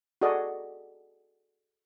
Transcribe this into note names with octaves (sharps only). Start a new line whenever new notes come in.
F#4 G#4 A4 D5 D#5